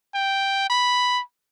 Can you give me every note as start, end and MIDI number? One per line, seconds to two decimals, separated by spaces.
0.14 0.66 79
0.70 1.21 83